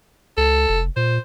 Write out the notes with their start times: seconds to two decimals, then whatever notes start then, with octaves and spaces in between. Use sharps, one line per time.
0.37 C#2 A4
0.69 F1
0.96 A#2 C5